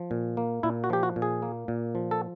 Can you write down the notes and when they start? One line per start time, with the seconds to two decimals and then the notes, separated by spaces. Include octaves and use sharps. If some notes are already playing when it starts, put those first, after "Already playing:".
Already playing: F3
0.11 A#2
0.37 A#3
0.63 A#2 E4
0.84 F#4
0.90 F3 G4
1.03 F#4
1.16 A#2
1.22 G#4
1.42 A#3
1.68 A#2
1.95 F3
2.11 A4